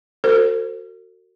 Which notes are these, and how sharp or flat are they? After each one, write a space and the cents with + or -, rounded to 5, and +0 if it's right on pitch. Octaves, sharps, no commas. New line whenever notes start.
F#4 +0 A4 +45 C5 +0